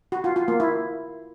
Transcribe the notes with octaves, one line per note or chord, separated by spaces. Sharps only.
F#4
F4
F4
A#3
E4